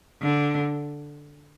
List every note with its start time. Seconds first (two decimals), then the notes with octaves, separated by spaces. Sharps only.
0.22 D3